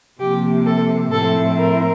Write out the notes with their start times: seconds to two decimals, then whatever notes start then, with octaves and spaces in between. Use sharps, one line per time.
0.20 C3 F3 A#3 G4
0.66 A4
1.11 A2 F3 C4 E4 A4
1.57 A#4